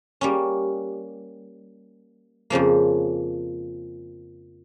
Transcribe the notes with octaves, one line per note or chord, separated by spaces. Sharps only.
G3 A#3 C#4
F2 C#3 F3 A#3